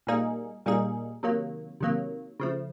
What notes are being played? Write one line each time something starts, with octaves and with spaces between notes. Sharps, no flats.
A#2 G3 A#3 D#4 G#4
A#2 G3 A#3 D#4 G#4
C3 D#3 F#3 A#3
C3 D#3 F#3 A#3
C#3 F3 A3